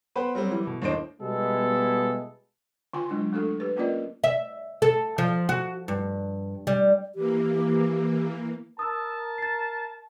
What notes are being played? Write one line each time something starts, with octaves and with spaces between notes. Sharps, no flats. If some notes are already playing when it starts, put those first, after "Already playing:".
B3 B4 C5 G5
F#3 G3 C4
E3 G3
B2
D#2 A2 D4 C5 D#5 D7
B2 G3 G#3 B3 E4 A4
D3 F4 G5 G#5 C6
F#3 G#3 D4 E4
A3 D4 F#4 A4
G4 B4
A#3 C#4 F4 A#4 D5 D#5
E5
A4
F3
F#4
G2
G3
E3 A#3 G4
A#4 A5 D#6 E6
A6 C7